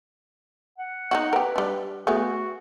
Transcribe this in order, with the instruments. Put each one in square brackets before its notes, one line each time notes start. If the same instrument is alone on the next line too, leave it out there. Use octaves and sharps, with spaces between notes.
[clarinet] F#5
[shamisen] D#4 E4 F#4
[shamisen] G4 A#4 [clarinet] B4
[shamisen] G3 D4
[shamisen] A3 B3 G#4 [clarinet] F#4